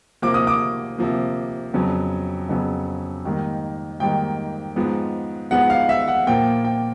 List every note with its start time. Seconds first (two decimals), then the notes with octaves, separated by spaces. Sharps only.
0.22 C3 F3 A#3 D6
0.34 D#6
0.47 D6
0.98 C3 F3 A#3
1.74 F2 C#3 F#3 B3
2.49 F2 C#3 F#3 B3
3.25 G#2 D#3 G3 A#3
4.00 G#2 D#3 G3 A#3 G5
4.76 G#2 F3 G#3 B3
5.51 G#2 F3 G#3 B3 F#5
5.70 F5
5.89 E5
6.08 F#5
6.27 A#2 F3 A#3 G5
6.65 G5